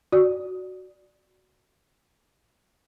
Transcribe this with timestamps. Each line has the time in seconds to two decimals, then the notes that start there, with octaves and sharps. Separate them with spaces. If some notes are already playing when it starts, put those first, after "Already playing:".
0.12 F#4 D5